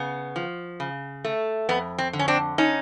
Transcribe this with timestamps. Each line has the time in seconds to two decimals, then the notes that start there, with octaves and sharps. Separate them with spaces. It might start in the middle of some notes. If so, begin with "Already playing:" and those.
Already playing: C#3 B3
0.36 F3
0.80 C#3
1.24 A3
1.69 F2 B3
1.98 C4
2.13 D3
2.19 C#4
2.28 C4 D4
2.58 C#4 D#4